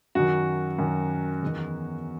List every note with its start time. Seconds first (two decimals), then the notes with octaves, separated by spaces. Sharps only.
0.15 F#2 D#3 F#4
0.78 F#2 D#3
1.43 E2 D#3